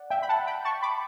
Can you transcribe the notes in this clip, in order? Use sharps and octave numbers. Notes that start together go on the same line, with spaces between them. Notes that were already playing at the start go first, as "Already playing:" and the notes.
Already playing: D5 F#5
E5 G5
B5
F#5 A5
G5 B5
A5 C#6
B5 D6